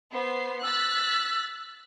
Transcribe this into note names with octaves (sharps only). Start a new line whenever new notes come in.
B3 C5 C7
E6 F#6 A6 B6